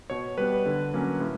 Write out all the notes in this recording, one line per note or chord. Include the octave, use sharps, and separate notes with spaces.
B2 C#5
G3 B3 B4
D3
F#3 A#3 C#4
A2